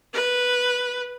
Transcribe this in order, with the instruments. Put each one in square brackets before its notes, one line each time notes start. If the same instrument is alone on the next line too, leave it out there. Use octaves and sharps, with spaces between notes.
[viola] B4